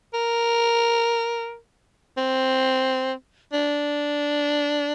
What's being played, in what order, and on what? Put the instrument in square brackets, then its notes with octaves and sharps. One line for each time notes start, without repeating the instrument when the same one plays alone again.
[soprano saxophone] A#4
C4
D4